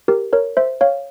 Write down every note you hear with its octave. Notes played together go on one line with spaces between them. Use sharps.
G4 A#4
A#4 C#5
C5 E5
C#5 F5